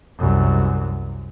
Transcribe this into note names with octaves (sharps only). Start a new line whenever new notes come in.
C2 F#2